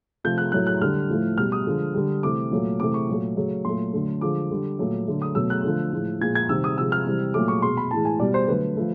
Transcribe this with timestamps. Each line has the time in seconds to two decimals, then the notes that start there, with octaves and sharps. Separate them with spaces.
0.24 C3 F3 A3 G6
0.38 F#6
0.52 A2 F#3 A3 F#6
0.67 F#6
0.82 D3 G3 F6
1.09 A2 F3 A3
1.38 B2 G3 F6
1.52 D#6
1.67 D3 F3 G#3
1.94 D3 G3
2.23 C3 E3 A3 D6
2.52 A#2 F#3 A3
2.80 C3 E3 A3 D6
2.94 C#6
3.08 A#2 F#3 A3
3.37 C#3 F#3 A3
3.65 A#2 F#3 A3 C6
3.93 D3 F#3 A3
4.21 D3 F3 G#3 D6
4.51 D3 G3
4.79 A#2 F#3 A3
5.07 D3 F#3 A3
5.22 D#6
5.35 B2 F#3 A3 E6
5.50 F#6
5.64 D3 F3 A3
5.92 A2 F3 G#3
6.21 A#2 F3 G#3 G#6
6.35 G#6
6.49 C3 D#3 G3 E6
6.64 D#6
6.77 C3 F3 G#3 E6
6.92 F6
7.06 C3 E3 G3
7.34 A#2 F#3 A3 D6
7.48 C#6
7.62 B2 G#3 C6
7.77 B5
7.91 A2 E3 G#3 A5
8.05 G#5
8.19 B2 G3 D5
8.34 C5
8.48 D3 F#3 A3 B4
8.77 F3 A3